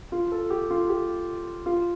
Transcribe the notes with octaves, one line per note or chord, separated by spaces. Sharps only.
F4
A4
G4
F4
G4
F4